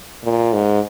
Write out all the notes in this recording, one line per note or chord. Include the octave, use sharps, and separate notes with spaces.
A#2
G#2